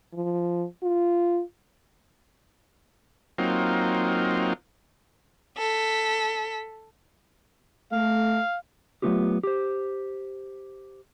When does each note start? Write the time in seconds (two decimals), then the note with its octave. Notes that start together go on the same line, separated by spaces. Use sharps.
0.14 F3
0.83 F4
3.38 F#3 A#3 C4 D#4 F4
5.58 A4 B6
7.92 A3 F5
9.02 F#3 G#3 A3 B3 F4 G4
9.43 G4 C5